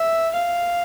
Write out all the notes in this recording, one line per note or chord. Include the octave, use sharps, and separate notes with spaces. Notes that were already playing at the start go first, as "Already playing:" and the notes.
Already playing: E5
F5